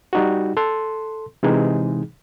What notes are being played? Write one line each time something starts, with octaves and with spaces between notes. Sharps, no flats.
G3 D#4 F#4
A4 C6
C3 E3 G#3 D#4 G#4